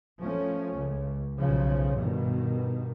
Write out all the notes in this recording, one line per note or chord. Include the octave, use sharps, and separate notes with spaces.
F3 A3 C#4
C#2
B1 C#3 F3
G2 B2 D#3